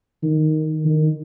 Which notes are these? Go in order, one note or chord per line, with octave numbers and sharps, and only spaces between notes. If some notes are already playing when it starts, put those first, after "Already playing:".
D#3
D#3